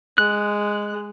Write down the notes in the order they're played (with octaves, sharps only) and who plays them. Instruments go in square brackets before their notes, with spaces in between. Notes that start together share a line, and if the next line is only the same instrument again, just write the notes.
[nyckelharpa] G#3 [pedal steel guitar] F#6